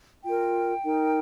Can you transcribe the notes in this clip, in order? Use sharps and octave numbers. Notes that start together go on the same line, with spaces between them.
F4 A#4 G5
D#4 A#4